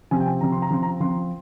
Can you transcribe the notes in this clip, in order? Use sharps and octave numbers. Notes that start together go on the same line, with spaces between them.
C3 F3 C4 G#5
G5
G#5
C3 F3 C4 A#5
C6
A#5
F3 C4 C6
A#5
F3 C4 C6